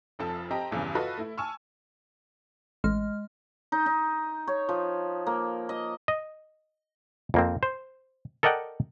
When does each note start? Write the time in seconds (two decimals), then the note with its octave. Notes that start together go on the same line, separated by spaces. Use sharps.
0.19 F1 F2 F3 A4 A5
0.51 C4 G4 D#5 G5 A5 A#5
0.71 A1 E2 G2 C#3 E3
0.95 F4 F#4 A4 B4 D#5
1.17 A3 E4
1.37 G#5 A5 C#6 E6 F6
2.84 A1 G#3 F6
3.72 D#4
3.86 D#4
4.47 C#5
4.69 F3
5.26 A#3
5.69 D#5
6.08 D#5
7.34 F2 A#3 C4
7.63 C5
8.43 A4 A#4 D5 D#5 F#5 G5